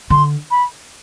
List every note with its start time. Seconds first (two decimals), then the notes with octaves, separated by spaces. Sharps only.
0.10 D3 C6
0.50 B5